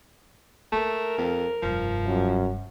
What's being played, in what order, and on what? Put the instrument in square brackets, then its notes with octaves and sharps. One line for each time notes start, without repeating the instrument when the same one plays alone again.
[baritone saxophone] A3 [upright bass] A#3 [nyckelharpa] A#4
[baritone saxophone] F2
[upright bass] F1 G2 [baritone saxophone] F3
[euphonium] F#2